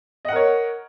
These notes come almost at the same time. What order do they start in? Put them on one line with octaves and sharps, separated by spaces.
D#5 F#5 A#4 C#5